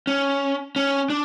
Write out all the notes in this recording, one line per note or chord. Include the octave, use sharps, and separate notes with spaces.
C#4
C#4
D4